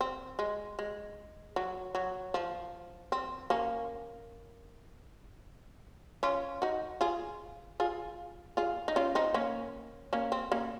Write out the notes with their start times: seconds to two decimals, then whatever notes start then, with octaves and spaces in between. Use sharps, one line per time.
0.01 C4
0.39 G#3
0.79 G#3
1.56 F#3
1.95 F#3
2.34 F3
3.12 C4
3.50 A#3 C#4
6.23 C#4 F4
6.62 D#4 F#4
7.01 F4 G#4
7.80 F4 G#4
8.57 F4 G#4
8.88 D#4
8.96 C#4 F4
9.15 C4 D#4
9.34 A#3 C#4
10.13 A#3 C#4
10.32 C4
10.52 A#3 C#4